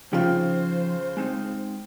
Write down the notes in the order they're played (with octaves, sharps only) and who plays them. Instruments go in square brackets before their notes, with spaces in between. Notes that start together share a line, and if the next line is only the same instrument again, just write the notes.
[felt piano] C#3 F4 [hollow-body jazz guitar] F3 D#4 G5 [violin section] C5
[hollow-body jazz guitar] G#3 C4 D#4